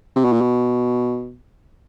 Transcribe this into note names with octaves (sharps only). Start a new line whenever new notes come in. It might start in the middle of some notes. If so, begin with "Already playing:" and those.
C3
B2
A#2
B2